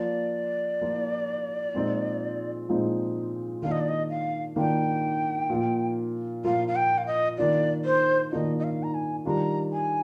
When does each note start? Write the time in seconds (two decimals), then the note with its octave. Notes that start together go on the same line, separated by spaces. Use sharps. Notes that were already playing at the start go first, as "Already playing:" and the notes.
Already playing: F3 A#3 F4 D5
0.81 F3 A#3 F4
1.75 A#2 F3 G#3 C4 D#4
2.69 A#2 F3 G#3 C4 D#4
3.62 D#3 A#3 D4 F4 F5
3.71 D#5
3.80 D5
3.88 D#5
4.09 F5
4.56 D#3 A#3 D4 F4 G5
5.50 A#2 F3 A#3 F4
6.44 A#2 F3 A#3 F4 F5
6.67 F5
6.75 G5
6.97 F5
7.06 D#5
7.37 D#3 A#3 D4 F4 D5
7.84 C5
8.31 D#3 A#3 D4 F4 D#5
8.58 D#5
8.63 F5
8.83 A#5
8.94 G#5
9.25 D#3 G3 D4 F4 A#5
9.72 G#5